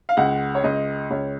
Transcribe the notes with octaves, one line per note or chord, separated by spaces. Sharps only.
F5
C#2 F#5
C#5
C#2 D#5
C#2 C#5